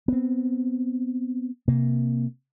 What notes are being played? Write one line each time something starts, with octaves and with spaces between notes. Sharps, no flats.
B3 C4
C3 A#3